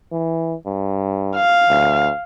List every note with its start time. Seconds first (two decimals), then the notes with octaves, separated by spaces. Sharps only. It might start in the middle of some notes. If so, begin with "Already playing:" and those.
0.12 E3
0.66 G2
1.37 F5
1.69 D2